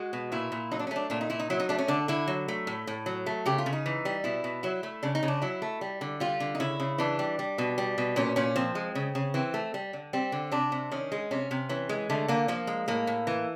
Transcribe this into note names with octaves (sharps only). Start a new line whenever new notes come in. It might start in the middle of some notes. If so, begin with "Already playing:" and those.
Already playing: G#3 F#4
B2
A#2 E4
A#2
F#3 D#4
D4
C#4
A3 D4
A#2 D4
D#4
A#2 E4
D#4
F#3 E4
D#4
A3 D4
C#4
D3 D4
D3 E4
F#3
A3
A2
A2
F#3
A3
C#3 G4
F4
C#3
D#4
E3
G3
B2 E4
B2
F#3 E4
A3
C#3 D4
D#4
C#3
D4
F#3 E4
A3
G3
D3
G3 F4
D3
D#4
C#3 E4
C#3
E3 D4
G3
G3
B2
G3
B2
A#2 C#4
A#2 C#4
F3 C4
G#3
C#3
C#3
E3 C4
A3
G3
D3
G3 C4
D3
C3 D4
C3
D#3 C#4
G#3
C3 C#4
C3
E3 C#4
G#3
D3 A3
D3 A#3
F3 A#3
G#3
A2 A#3
A2
E3